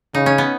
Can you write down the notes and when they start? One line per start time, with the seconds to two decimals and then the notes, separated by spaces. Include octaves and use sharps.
0.14 C#3 D#4
0.26 C#4
0.38 B3